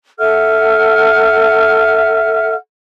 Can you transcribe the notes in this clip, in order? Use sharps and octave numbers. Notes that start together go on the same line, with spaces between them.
A4 E5 F#5 F6